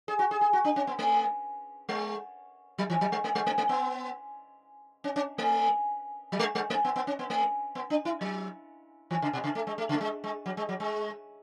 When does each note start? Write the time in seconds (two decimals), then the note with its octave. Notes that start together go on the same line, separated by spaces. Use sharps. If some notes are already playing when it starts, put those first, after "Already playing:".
0.08 G#4
0.19 F#4
0.31 G#4
0.41 G#4
0.53 F#4
0.65 D4
0.76 C#4
0.87 B3
0.99 A3
1.89 G#3
2.78 F#3
2.90 E3
3.01 F#3
3.12 G#3
3.24 A3
3.35 G#3
3.47 A3
3.58 A3
3.69 B3
5.04 C#4
5.16 C#4
5.38 A3
6.32 F#3
6.39 G#3
6.55 G#3
6.70 A3
6.85 B3
6.96 B3
7.07 C#4
7.19 B3
7.30 A3
7.75 B3
7.90 D4
8.05 E4
8.21 F#3
9.11 E3
9.22 C#3
9.33 B2
9.44 C#3
9.55 A3
9.67 G#3
9.78 A3
9.89 C#3
9.95 A3
10.01 G#3
10.24 G#3
10.46 F#3
10.57 G#3
10.69 F#3
10.80 G#3